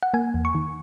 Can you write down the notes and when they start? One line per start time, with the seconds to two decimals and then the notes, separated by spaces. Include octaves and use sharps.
0.03 F#5
0.14 A#3 G#5
0.34 E2
0.45 C#6
0.55 D#3